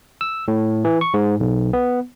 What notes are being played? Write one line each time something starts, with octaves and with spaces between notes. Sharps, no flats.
E6
A2
E3
C#6
G#2
B1
B3